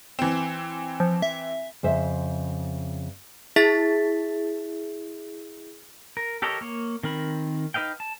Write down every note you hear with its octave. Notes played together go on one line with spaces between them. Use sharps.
E3 C4
F3
E5
F2 C#3 C5 E5
E4 G#4 E5 A6 B6
A#4
G4 A4 A#4 C#5 D#5
A#3 C#5
D#3 C4 A#4 B5
D#4 B4 D#5 F5 G5
A5